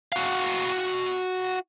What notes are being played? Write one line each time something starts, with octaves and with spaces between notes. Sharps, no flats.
F#4 F5